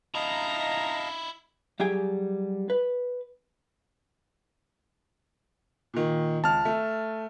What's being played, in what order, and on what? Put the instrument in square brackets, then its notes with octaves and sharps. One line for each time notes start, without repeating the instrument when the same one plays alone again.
[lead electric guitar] D#4 E4 [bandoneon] D#5 F5 A5 [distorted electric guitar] A#5
[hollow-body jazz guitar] F#3 G3 G4 G#4 G5 G#5
B4
[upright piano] A#2 D#3
[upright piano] C#2 [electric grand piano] A5 F6
[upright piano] A3